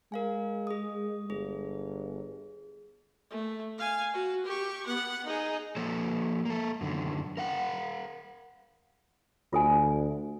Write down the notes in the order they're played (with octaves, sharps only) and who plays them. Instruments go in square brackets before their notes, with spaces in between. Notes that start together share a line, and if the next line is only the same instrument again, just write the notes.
[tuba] G#3 [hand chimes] A#4 F5 G#5
[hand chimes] G#4 D#6
[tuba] G1 [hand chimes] G#4
[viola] A3
F5 G#5
F#4
G4 C#6
B3 F#5
D#4 G#4
[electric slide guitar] F3 A#3 A4 C#5
A#3 A4
F#2 D3 D#3
A#4 F5 F#5
[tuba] D2 [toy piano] F4 A4 G#5